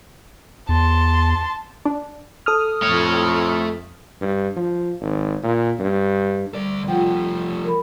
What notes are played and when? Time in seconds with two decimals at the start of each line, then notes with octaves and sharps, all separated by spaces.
0.69 E2 A5 C6
1.85 D4
2.46 A4 D#6 F6
2.82 F2 A3 C#5
4.21 G2
4.56 F3
5.01 G#1
5.43 A#2
5.79 G2
6.55 D2 G3 D5
6.88 F3 A3 F4 F#5 G5
7.65 A#4 B5